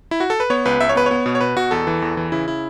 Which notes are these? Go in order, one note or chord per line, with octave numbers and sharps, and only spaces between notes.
E4
F#4
A4
B4
B3 C#5
C#2 B4
C#2 E5
C#5
B3 B4
B3 C#5
B2
C#5
B2 B4
B2 F#4
E2 A4
E3
E2
E3
C#3 E4
E4